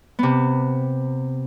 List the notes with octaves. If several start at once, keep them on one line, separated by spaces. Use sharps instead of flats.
C3 B3